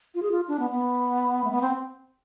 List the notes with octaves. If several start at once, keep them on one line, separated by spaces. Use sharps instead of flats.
F4
G#4
F4
D4
B3
B3
A3
B3
C4